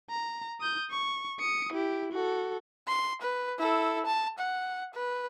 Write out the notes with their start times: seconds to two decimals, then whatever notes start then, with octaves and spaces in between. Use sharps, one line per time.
0.10 A#5
0.61 D#6 G6
0.91 C#6
1.40 D#6 C#7
1.73 E4 G4
2.12 F#4 A4
2.88 C6
3.21 B4
3.59 E4 A4
4.06 A5
4.39 F#5
4.94 B4